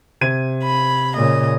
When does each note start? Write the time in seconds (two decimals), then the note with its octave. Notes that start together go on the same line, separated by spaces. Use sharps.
0.21 C3 G#6 D#7
0.63 B5
1.16 A#2 C#3 D#5